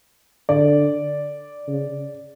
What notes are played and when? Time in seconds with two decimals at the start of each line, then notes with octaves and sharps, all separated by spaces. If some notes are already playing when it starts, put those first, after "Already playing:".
0.49 D3 D5
1.67 C#3